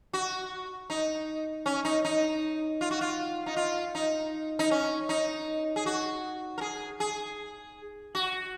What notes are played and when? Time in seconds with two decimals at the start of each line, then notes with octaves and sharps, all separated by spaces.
0.13 F#4
0.90 D#4
1.66 C#4
1.85 D#4
2.05 D#4
2.81 F4
2.91 F#4
3.01 F4
3.46 D#4
3.56 F4
3.95 D#4
4.59 D#4
4.71 C#4
5.09 D#4
5.76 G#4
5.86 F#4
6.58 A#4
6.61 G#4
7.00 G#4
8.15 F#4